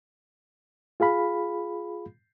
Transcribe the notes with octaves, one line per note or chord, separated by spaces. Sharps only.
F4 G#4 F5 B5